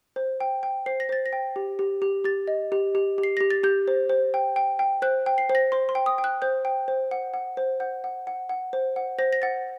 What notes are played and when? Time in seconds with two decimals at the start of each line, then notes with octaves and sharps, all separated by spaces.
0.16 C5
0.40 G5
0.63 G5
0.86 C5 C7
1.00 A#6
1.09 C5 A6
1.26 A#6
1.33 G5
1.56 G4
1.79 G4
2.02 G4
2.24 G4 A6
2.48 D#5
2.72 G4
2.95 G4
3.18 G4
3.23 C7
3.37 G4 A#6
3.50 A6
3.63 G4 G6
3.88 C5
4.10 C5
4.34 G5
4.56 G5
4.79 G5
5.02 C5 F#6
5.26 G5
5.38 C7
5.49 C5
5.55 A#6
5.72 C5 C6
5.89 C6
5.95 G5
6.06 D#6
6.18 G5
6.24 F#6
6.42 C5 G6
6.65 G5
6.88 C5
7.11 F#5
7.34 F#5
7.57 C5
7.80 F#5 G6
8.04 F#5
8.27 F#5
8.49 F#5
8.73 C5
8.96 F#5
9.19 C5 A#6
9.33 A#6
9.42 F#5 A6